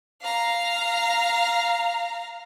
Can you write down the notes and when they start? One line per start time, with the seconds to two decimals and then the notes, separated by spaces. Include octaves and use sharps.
0.21 F5 A#5